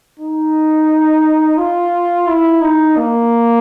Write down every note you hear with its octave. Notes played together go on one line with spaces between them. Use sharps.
D#4
F4
E4
D#4
A#3